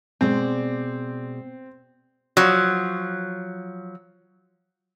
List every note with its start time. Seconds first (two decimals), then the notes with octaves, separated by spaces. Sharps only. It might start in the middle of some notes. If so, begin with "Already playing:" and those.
0.21 B2 G#3 C4 D5
2.37 F3 F#3